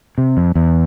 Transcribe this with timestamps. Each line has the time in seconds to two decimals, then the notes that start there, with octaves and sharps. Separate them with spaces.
0.18 C3
0.37 F2
0.55 E2